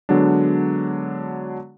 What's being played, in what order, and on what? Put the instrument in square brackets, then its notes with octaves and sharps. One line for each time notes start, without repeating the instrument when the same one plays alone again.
[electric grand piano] D3 F#3 G#3 B3 D4